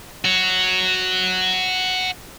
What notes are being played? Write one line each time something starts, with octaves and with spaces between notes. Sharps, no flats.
F#4 C#5